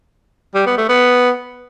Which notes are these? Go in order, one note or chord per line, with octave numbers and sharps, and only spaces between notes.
G3
B3
A3
B3